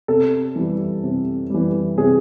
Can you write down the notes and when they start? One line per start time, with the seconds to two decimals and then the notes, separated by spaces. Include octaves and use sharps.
0.08 C3 A4
0.56 E3 G3
1.03 C3
1.50 E3 G3
1.98 C3 G#4